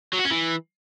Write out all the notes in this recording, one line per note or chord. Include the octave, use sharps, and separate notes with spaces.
F#3
F#4
C#4
E3